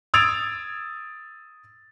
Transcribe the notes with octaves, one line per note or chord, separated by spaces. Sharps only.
D#6 E6 G#6 A6 D7 F7